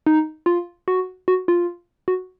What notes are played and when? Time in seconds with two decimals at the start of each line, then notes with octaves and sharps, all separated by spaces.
0.07 D#4
0.46 F4
0.88 F#4
1.28 F#4
1.48 F4
2.08 F#4